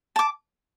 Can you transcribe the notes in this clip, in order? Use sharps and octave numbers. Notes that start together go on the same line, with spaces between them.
A5 D6